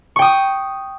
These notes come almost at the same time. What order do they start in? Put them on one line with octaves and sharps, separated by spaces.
C#6 G5 D#6